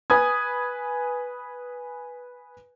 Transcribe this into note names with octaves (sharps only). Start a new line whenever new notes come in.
B4 G#5 D#6 G#6